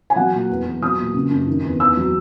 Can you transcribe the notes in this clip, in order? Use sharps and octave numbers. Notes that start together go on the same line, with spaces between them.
G#5
F#3 F#5
A#2
E2
E2
F#3 D#6
A#2
C#3
F#2
D#3
E2
E2 E6
F#3